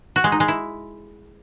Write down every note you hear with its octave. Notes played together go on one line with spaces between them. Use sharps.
F#4
G#3
D#4
G#3
E4